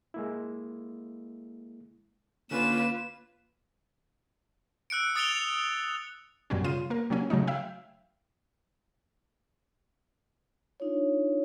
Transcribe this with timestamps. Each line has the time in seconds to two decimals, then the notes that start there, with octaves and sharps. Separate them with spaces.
0.14 G#3 A#3 E4
2.51 D3 A#3 C#4 F4 B4 E7
4.90 E6 F#6 C#7 D7
5.15 D#6 A6 C#7 D7 F7 G7
6.50 F#2 B2 G3 C#4
6.64 C#3 F4 D#7
6.90 A#3 A#4
7.10 C3 F#3 A#3 C#4
7.30 C#3 F#3 A3 D#4
7.47 E5 F5 G5
10.80 D4 D#4 F4 C#5